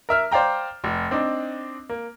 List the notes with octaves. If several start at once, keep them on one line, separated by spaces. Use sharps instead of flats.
A#4 E5 F6
C5 D5 F5 G5 A#5
F1
C4 D4 D#4
A#3